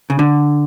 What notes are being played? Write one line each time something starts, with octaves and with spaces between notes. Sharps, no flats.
C#3
D3